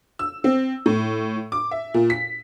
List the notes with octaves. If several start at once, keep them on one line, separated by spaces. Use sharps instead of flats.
E6
C4
A2
D6
E5
A#2
B6